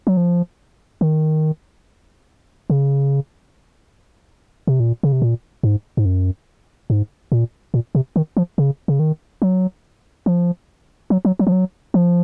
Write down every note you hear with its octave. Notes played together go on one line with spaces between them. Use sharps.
F#3
F3
D#3
C#3
C3
A#2
C#3
C3
A#2
G#2
G#2
F#2
G#2
A#2
A#2
C3
D#3
F3
C#3
C#3
D#3
F#3
F3
F#3
F#3
F#3
F3
F#3
F3